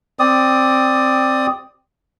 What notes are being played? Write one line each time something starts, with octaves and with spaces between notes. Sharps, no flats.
C4 D5 D#6